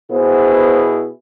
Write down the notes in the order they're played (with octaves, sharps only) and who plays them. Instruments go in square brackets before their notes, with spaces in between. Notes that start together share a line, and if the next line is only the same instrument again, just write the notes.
[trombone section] B2 E4 G#4 [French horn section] B3 C5